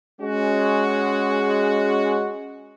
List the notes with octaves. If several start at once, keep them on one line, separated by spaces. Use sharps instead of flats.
G#3 C#4 F#4